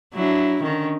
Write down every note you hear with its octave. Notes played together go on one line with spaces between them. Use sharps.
F#3 D4 E4
D3 D#3 C#4